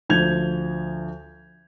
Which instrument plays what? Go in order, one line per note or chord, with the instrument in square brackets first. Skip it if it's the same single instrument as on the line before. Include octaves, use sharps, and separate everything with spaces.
[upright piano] D2 F3 G6 G#6 F7